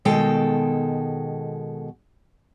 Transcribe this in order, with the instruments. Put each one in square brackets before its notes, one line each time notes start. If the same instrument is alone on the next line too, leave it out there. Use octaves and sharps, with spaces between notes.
[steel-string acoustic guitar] B2 D#3 G#3 A4 G5